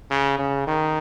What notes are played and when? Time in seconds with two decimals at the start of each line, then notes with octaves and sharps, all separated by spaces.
0.11 C#3
0.38 C#3
0.67 D#3